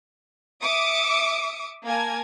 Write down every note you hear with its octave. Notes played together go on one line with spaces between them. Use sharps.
E5 D6 D#6 C#7 D7
A#3 A#4 G#5 A5 G#6